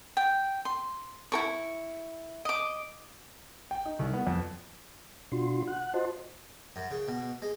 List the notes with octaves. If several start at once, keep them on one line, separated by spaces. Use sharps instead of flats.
G5
C6
E4 A#4 C#6
D#5 D6
G5
D#4
C2
B3
F2
B2 D4 F4 F#4 C6
F#5 F#6
F4 F#4 C5 D#5 A5 C6
F#2
C#3
B2
G#3